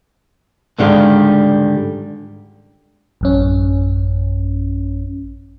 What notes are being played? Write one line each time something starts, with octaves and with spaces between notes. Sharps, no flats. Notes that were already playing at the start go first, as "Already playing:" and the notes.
C#2 G#2 D3 D#3 G3 F5
A1 F#2 C#4